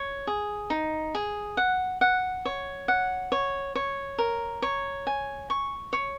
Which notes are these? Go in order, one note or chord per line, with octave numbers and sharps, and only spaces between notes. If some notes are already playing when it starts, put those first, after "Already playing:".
Already playing: C#5
G#4
D#4
G#4
F#5
F#5
C#5
F#5
C#5
C#5
A#4
C#5
G#5
C#6
C#5